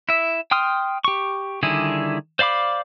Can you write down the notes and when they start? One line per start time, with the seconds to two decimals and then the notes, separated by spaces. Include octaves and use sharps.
0.09 E4 E5
0.51 G5 C6 D#6 F6
1.04 G4 C#6
1.63 D3 D#3 G3 E4 G#4
2.39 C5 D5 F5 B5 D6